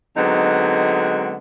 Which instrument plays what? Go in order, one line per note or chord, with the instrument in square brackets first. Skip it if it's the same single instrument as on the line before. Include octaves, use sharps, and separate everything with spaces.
[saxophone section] D3 F#3 G#3 B3 C4 D#4